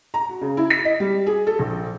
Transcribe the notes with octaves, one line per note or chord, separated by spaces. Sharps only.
A#5
F#4
C#3
E4
B6
D#5
G3
G#4
A4
A#1